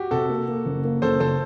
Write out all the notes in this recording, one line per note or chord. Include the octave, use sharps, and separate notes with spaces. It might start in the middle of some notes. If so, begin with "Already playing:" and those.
Already playing: F#4 G4
C3 F#4 A4
A#3
A#3
F#1
A#3
F#1 A4 C5
F#1 A4 C5